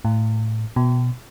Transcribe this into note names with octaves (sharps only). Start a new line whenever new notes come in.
A2
B2